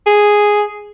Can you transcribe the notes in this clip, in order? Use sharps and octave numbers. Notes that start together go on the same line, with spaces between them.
G#4